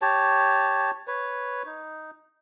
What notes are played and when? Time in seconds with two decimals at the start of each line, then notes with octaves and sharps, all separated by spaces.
0.02 G4 C#5 A5
1.07 B4 C#5
1.66 D#4